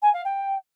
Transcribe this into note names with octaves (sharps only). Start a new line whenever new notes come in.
G#5
F5
G5